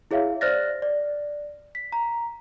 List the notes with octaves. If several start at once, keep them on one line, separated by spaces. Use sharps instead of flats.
E4 G#4 C#5 E5 F5
C5 D5 F6 F#6 A6 A#6
D5
B6
A#5